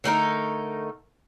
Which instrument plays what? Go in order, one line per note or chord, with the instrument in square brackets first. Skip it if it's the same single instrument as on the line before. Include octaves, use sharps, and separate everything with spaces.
[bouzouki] D3 A3 D#4 A#4